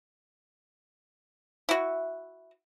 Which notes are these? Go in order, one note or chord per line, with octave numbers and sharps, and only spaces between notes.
E4 F#4